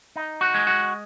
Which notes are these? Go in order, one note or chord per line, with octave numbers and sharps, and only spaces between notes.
D#4
F#4
G#3
F#4